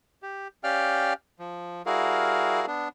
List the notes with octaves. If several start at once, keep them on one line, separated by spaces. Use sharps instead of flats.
G4
C#4 G4 D5 F5 G5 F6
F3
G3 E4 F#4 G#4 A#4 F5
B3 D4